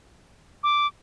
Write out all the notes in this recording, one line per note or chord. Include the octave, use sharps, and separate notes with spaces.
D6